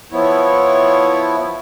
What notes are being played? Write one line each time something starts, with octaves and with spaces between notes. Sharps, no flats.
F3 B3 E4 C#5